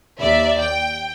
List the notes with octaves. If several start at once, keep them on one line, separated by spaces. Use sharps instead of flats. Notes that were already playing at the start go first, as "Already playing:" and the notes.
D#2 D5 E5
G5